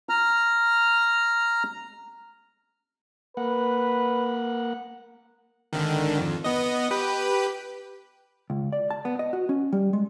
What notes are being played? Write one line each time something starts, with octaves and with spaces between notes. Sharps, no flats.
A#5 F6
A#3 B4 F#5
G#1 D3 D#3
F2
B3 D#5
G4 B4
C#2
D5
A5
B3
D#5
F#4
C#4
G3
G#3